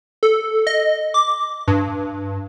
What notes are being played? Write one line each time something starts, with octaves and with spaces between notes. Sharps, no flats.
A4
D#5
D6
G2